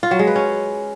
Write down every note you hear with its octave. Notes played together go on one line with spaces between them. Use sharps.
F4
F#3
G#3
B4
C#4